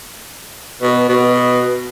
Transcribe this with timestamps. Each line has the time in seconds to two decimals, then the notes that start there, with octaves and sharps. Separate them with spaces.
0.82 B2
1.09 B2